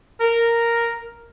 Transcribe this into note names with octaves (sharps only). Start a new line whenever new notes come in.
A#4